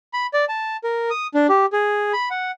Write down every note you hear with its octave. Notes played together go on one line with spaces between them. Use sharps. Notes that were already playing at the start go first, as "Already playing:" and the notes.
B5
D5
A5
A#4
D#6
D4
G4
G#4
B5
F#5